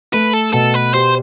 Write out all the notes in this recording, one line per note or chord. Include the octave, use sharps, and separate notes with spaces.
A3 B4
A4
B2 A4
B4
G4 C5